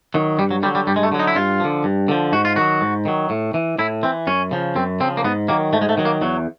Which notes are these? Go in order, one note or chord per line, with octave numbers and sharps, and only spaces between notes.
D#3 F#3
G2 G3
F#3
D3 F#3 G3
G3
G2 G3
G#3
A3
D3 F#3
D#4
E4
G2 F4
D3 F3
G2
D3 F3
G#2 F#4
F4
D#3 F#3 F#4
G#2
D#3 F#3
A2
E3
A2 E4
E3 C4
F#2 C#4
C#3 F3
F#2 C4
C#3 F3 C4
A#3
G#2 B3
D#3 F#3 A#3
G#2 A3
G#3
A3
D#3 F#3
A#3
E2 F#3